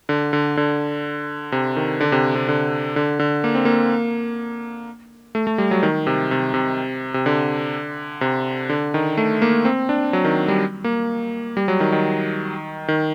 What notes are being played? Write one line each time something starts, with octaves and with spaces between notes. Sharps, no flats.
D3
D3
D3
C3
D#3
D3
C3
C3
D3
D3
D3
A#3
C4
A#3
A3
A3
G3
F#3
D#3
C3
C3
C3
C3
D3
C3
D3
D#3
A3
A#3
C4
D4
F#3
D#3
G3
A#3
G3
F#3
D#3
D#3
D#3